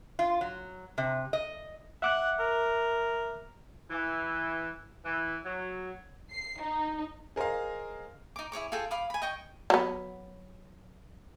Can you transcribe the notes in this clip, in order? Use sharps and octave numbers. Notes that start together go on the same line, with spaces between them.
F4
F#3
C3
D#5
E5 F#5 D6 F#6
A#4
E3
E3
F#3
C7
D#4
G#4 A#4 C5 D#5 F5
D#4 D6
E4 G#4 C#5 D6
F4 G#4 A4 G5
F5 B5 D6 D#6
G#5 B5
D#5 G5 C#6
F#3 B3